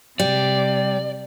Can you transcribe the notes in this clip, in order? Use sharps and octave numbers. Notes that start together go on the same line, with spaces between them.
C3 G3 D5